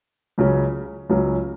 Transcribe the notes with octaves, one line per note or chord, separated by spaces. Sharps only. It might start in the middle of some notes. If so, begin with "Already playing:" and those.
C#2 C#3 F#3 C#4
C#2 C#3 F#3 C#4